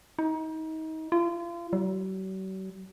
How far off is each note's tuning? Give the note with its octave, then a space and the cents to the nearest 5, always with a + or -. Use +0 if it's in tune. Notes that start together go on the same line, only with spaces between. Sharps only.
D#4 +30
F4 -35
F#3 +45